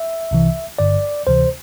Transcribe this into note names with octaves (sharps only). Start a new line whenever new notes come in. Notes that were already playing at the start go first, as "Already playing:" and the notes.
Already playing: E5
C2 C3 E3
G1 G2 D3 D5
D2 C3 E3 C5